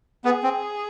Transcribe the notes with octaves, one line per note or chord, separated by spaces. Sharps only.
B3 G#4
C4